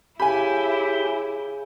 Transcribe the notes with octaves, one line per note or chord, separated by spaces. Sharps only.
C#3 E4 G4 G#5 B5